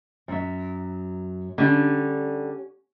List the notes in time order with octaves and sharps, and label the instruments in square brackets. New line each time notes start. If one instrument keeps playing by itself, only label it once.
[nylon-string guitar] F#2 F#3 E5
[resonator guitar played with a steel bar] D3 G3 [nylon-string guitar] C#4 G4